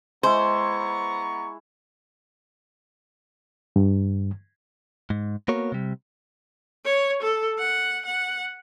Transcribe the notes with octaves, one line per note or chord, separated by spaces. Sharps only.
G#3 B3 E4 C5 A#5 C#6
G2
G#2
A#3 B3 F#4 A#4 C#5
C3 G3
C#5
A4
F#5
F#5